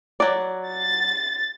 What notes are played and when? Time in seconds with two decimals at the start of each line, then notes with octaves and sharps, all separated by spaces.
0.20 F#3 D5
0.69 A6